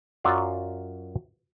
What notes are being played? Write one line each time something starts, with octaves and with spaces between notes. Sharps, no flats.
F#2 F#3 F4 D5 F5